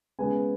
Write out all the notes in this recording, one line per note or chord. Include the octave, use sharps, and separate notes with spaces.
C#3 G#3 B3 G#5